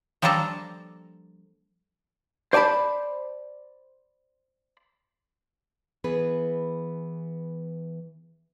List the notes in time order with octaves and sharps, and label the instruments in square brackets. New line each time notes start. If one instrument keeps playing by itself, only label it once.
[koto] F3 G3 A#3 D4 A4 A#5
[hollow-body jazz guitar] C5 D5 G#5 A5 B5
[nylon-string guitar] E3 B3 G#4 B4